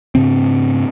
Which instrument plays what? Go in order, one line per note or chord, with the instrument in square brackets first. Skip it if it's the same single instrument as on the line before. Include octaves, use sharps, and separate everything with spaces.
[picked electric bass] G#2 C#3 C4